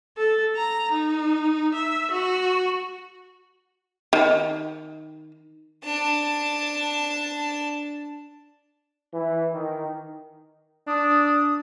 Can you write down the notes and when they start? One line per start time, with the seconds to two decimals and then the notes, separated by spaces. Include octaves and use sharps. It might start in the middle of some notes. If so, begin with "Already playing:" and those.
0.18 A4
0.56 A#5
0.92 D#4
1.74 E5
2.11 F#4
4.13 D#3
5.84 D4 A5
9.13 E3
9.52 D#3
10.88 D4 D#6